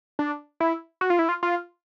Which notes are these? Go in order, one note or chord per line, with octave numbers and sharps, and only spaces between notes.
D4
E4
F#4
F4
E4
F4
F4